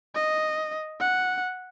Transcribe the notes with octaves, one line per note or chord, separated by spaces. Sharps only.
D#5
F#5